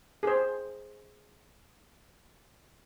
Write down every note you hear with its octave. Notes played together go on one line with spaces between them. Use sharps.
G#4 C5